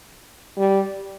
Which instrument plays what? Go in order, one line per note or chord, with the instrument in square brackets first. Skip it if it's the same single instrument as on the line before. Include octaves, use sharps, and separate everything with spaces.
[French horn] G3